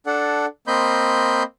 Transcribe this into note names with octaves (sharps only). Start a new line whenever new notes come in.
D4 A4 F#5
A#3 C4 D#5 B5 C6 G6